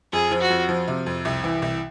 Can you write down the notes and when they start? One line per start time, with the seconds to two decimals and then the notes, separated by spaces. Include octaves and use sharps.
0.13 F2 G#4
0.31 F3
0.41 F#4
0.50 F2
0.69 F3
0.88 C3
1.06 F2
1.25 C2
1.44 E3
1.62 C2